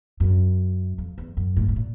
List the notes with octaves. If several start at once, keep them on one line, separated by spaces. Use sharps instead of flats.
F#2
F2
E2
F#2
A2
A2
A#2